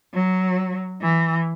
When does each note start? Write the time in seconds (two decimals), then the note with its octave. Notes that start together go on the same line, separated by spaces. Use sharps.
0.14 F#3
1.01 E3